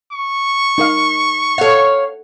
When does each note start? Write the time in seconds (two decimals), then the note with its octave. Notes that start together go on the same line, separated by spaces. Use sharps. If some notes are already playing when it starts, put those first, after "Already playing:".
0.12 C#6
0.78 D#4 A#4 F5
1.58 A4 C#5 F5 F#5